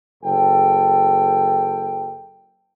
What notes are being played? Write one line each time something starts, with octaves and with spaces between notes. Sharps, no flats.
F#1 A4 G5